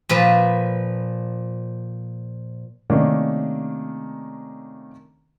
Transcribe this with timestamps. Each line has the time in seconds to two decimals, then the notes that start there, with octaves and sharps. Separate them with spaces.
0.09 A#2 F3 B4
2.90 C3 D#3 A3 A#3 C#4 D4